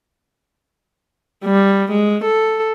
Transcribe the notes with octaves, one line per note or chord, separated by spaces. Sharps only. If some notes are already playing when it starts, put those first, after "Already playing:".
G3
G#3
A4